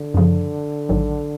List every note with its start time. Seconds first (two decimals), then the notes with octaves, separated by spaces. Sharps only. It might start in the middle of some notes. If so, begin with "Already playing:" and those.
Already playing: D3
0.14 F#2 C#3 F3
0.89 A1 G#2 D#3 F#3